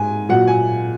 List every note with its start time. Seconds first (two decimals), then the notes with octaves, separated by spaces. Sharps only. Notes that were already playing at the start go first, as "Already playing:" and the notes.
Already playing: G#2 G#5
0.29 A#2 F#3 F#5
0.48 G#5